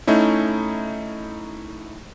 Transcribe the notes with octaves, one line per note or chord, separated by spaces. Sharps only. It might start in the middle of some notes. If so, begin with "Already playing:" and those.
A3 C#4 D#4 E4